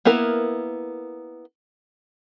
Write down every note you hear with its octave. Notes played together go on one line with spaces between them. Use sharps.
A#3 B3 E4 A#4